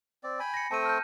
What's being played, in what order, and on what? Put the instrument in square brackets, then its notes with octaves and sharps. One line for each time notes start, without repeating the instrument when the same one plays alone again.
[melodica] C4 D5
G5 G#5 B5
[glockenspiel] A#6 C#7
[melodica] A3 C4 G5 [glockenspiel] A5 D#7
[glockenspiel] F6 G6